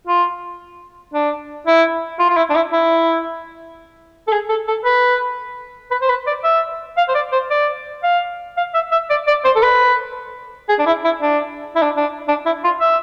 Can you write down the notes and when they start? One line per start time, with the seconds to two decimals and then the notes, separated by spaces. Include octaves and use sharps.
0.07 F4
1.14 D4
1.67 E4
2.19 F4
2.29 F4
2.37 E4
2.50 D4
2.56 E4
2.72 E4
4.28 A4
4.33 G#4
4.49 A4
4.68 A4
4.85 B4
5.91 B4
6.01 C5
6.09 B4
6.27 D5
6.44 E5
6.97 F5
7.09 C5
7.15 D5
7.32 C5
7.51 D5
8.04 F5
8.57 F5
8.74 E5
8.92 E5
9.10 D5
9.27 D5
9.45 C5
9.56 A4
9.63 B4
10.69 G#4
10.79 D4
10.87 E4
11.05 E4
11.22 D4
11.76 E4
11.82 D4
11.97 D4
12.28 D4
12.46 E4
12.64 F4
12.81 E5